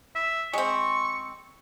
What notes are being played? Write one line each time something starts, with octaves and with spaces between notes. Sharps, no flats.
E5
G#3 C4 C#6